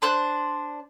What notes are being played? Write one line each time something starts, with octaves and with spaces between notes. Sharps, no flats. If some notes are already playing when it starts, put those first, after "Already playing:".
D4 C5 F#6